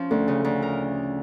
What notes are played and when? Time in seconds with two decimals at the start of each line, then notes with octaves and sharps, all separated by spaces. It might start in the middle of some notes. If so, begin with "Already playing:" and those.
Already playing: F3 C#4
0.10 D2 A3
0.28 C#3
0.44 D2
0.62 A#4